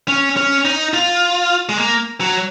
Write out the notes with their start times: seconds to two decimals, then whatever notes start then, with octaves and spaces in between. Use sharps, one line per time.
0.08 C#4
0.37 C#4
0.65 D#4
0.94 F4
1.69 G#3
1.77 A#3
2.21 F#3